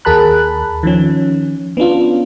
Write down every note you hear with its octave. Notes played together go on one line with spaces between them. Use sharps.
D#2 G#4 A#4 A5 B5 F#6
D#3 F3 C#4
B3 C#4 D4 F4